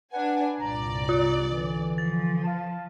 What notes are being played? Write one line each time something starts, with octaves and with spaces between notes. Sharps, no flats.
D4 B4 F#5 G#5
C2 G2 A#2 D5 A#5
F4
D3 E3
F3 A6
F5 A5